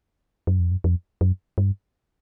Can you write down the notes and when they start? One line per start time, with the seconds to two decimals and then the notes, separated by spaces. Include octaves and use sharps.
0.47 F#2
0.59 F2
0.72 F#2
0.84 F2
1.21 F#2
1.58 G2